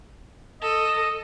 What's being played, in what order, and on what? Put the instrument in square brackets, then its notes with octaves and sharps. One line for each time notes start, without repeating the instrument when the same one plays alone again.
[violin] A4 [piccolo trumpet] D#5